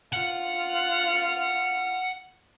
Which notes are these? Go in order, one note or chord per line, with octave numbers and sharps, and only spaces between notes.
F4 F#5 F6